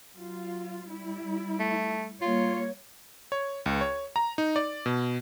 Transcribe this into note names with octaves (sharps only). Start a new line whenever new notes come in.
F#3 F4
G3 E4
A3
G3 A#3 F4 C#5
C#5
C#2
C#5
A#5
D#4
D5
B2